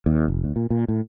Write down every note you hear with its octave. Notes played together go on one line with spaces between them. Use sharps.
D#2
F1
D2
A#2
A#2
A2